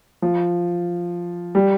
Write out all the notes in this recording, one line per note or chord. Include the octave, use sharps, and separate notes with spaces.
F3
G3